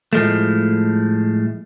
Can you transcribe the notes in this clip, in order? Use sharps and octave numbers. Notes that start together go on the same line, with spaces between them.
A2 F3 G#3 A3